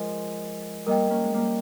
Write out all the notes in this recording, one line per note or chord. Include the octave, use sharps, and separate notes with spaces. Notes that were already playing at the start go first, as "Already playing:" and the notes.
Already playing: F3 G#3 A#4 D#5 G#5
G3 A#3 A#4 D#5 G5
A#3 C#4
G#3
G3 A#3